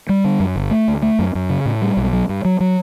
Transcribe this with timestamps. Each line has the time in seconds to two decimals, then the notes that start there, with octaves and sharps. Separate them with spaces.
0.09 G3
0.24 D3
0.40 F#2
0.56 G1
0.71 A3
0.88 D2
1.02 A3
1.19 F#2
1.35 F#2
1.50 C#3
1.66 A2
1.82 G3
1.97 B1
2.13 F#3
2.29 G2
2.45 F#3
2.60 F#3